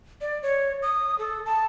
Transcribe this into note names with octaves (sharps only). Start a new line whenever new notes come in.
D5
C#5
D#6
A4
A5